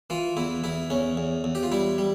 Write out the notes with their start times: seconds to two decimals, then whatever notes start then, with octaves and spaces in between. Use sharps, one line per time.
0.10 E3 F4
0.37 E2 E4
0.64 E2 E4
0.90 E2 C#4
1.17 E2
1.44 E2
1.55 G4
1.63 F4
1.72 G3 E4
1.98 G3